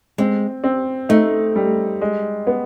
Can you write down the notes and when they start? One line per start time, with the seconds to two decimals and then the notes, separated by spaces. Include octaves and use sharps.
0.18 G#3 C4
0.64 C4
1.09 A3 D#4
1.56 G3
2.01 G#3
2.47 B3